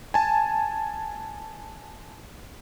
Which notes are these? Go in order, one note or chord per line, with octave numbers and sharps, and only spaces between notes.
G#5 A5